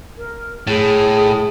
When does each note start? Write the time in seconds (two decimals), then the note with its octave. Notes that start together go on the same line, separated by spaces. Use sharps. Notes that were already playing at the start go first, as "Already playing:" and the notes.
0.17 A#4
0.67 A2 G#4